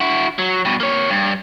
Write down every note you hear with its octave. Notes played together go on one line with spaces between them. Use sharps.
E4 F#4
F#3
G2 B2
A#3 C#5
G2